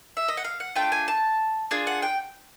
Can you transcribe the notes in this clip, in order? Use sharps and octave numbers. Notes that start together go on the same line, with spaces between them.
E5
D#5
F#5
F5
F#5
A3 D4 F4 G5
G#5
A5
D4 F4 G#4
F#5
G5